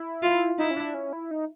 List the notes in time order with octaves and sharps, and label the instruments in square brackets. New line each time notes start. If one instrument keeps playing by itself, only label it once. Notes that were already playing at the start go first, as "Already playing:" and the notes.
Already playing: [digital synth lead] E4
[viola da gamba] F4
[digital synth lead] D#4 [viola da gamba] E4
[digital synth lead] C#4
D4
C#4
E4
D#4